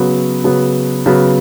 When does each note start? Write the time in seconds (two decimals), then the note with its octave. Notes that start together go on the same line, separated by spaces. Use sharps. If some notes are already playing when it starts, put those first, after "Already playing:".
Already playing: C#3 F#3 B3
0.44 C#3 F#3 B3
1.06 C#3 F#3 B3